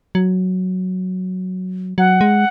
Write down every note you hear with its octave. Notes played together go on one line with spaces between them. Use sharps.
F#3
F#3 F#5
G#3